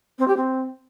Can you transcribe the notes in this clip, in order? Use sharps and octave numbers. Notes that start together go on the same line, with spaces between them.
C4
G4
C4